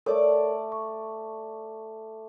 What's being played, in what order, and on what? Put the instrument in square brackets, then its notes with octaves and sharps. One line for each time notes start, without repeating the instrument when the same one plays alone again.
[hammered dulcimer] A3 D5 D6 [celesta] A4 A#4 C#5
[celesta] C#6